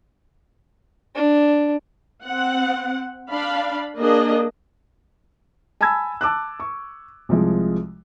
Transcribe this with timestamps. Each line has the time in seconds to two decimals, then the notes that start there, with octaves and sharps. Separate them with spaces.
1.16 D4
2.24 C4 F#5
3.30 D4 F5 B5
3.98 A#3 D4 G#4 D#5
5.81 G#5 A5 B5 E6 G#6
6.21 A5 D6 E6 F#6
6.60 C#6
7.29 C2 F3 G#3